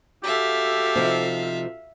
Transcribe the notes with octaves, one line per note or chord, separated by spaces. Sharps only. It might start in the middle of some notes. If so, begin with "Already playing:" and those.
F#4 G4 A4 E5 F5
C3 F3 D#4